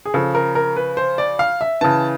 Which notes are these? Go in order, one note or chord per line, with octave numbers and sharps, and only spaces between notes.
G#4
C#3 F3 A4
A#4
A#4
B4
C5
D5
F5
E5
C#3 E3 A5